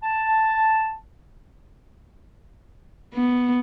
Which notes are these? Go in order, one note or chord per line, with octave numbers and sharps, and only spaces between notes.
A5
B3